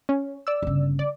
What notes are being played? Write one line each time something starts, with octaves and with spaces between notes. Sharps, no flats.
C#4
D5 E6
G1 C#3
D5